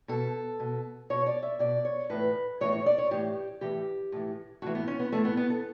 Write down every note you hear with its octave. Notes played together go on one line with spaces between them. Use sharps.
B2 A4
B2
B2 C#5
D5
E5
B2 D5
C#5
A2 E3 B4
A2 E3 C#5
C#5
D5
C#5
A2 E3 G4
A2 E3 G4
A2 E3
A2 E3 F#4
B3
C#4
B3
A2 E3 A3
B3
B3
A4